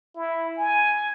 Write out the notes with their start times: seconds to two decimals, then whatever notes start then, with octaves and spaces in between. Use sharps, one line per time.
0.15 E4
0.57 G#5